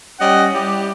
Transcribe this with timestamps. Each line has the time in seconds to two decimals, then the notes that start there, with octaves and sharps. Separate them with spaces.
0.20 G3 C#4 D#5 F#5
0.53 G3 E4 G4